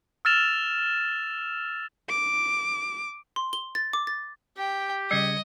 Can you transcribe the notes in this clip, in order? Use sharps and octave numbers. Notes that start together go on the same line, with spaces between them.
E6 F6 A6 E7 F7
D6
C6
G7
A6
D6
A6
G4 G5
C#3 G3 D#5 G#6 C#7